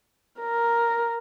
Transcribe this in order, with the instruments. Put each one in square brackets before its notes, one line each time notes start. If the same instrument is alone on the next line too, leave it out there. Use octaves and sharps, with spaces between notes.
[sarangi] A#4